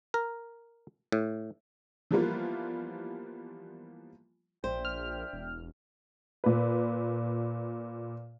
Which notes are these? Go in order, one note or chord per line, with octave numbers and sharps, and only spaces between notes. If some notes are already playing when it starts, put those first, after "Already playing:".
A#4
A2
E3 F3 G3 A#3 B3 F4
A#1 D4 C5 E5 G5
F6
E1
A#2 B4